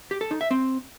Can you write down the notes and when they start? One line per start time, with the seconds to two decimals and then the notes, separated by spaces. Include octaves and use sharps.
0.11 G4
0.21 A4
0.31 D#4
0.41 E5
0.51 C4